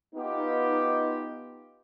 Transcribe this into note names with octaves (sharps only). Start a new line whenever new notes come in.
B3 D#4 F4 G4